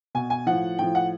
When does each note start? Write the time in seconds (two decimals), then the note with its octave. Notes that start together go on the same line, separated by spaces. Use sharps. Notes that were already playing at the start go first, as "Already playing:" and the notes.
0.15 B2 G#5
0.30 G#5
0.46 A2 F3 F#5
0.79 A2 F3 G5
0.95 F#5